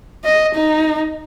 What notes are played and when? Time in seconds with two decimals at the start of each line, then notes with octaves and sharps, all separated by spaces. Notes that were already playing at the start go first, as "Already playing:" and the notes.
0.24 D#5
0.55 D#4